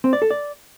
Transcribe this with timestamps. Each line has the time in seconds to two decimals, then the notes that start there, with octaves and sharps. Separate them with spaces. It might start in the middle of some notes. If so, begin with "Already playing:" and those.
0.04 C4
0.13 D5
0.22 A4
0.31 D5